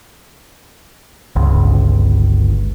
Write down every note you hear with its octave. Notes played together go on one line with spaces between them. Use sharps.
G1 C#2